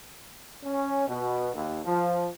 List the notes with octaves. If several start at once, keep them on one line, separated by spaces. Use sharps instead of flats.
C#4
B2
D#2
F3